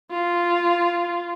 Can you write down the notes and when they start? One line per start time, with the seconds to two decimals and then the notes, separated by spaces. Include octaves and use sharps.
0.11 F4